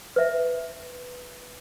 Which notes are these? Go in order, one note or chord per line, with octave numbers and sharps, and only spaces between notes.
B4 E5